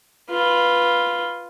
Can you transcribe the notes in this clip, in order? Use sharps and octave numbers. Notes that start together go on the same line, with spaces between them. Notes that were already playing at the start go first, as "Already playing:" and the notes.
F4 B4